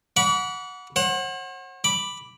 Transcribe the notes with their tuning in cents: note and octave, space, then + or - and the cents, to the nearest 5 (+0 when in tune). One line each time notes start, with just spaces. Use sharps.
F#5 -15 B5 -20 D6 -45
C5 +45 F#5 +0
B5 +0 D6 +0